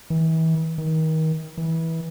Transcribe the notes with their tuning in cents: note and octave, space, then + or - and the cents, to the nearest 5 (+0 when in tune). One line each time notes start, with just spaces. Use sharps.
E3 -35
D#3 +30
E3 -20